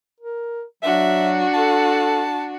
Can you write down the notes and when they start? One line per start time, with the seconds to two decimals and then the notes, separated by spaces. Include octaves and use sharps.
0.20 A#4
0.83 F#3 D4 F#4 E5
1.54 A4 A5